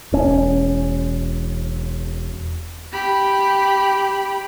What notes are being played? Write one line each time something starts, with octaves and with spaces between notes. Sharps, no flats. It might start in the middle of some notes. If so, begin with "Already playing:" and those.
E1 C#4
G4 B5